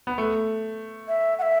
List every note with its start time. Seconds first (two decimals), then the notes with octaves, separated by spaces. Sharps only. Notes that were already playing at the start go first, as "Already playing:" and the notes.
0.07 B3
0.18 A3
1.08 E5
1.38 F#5
1.42 E5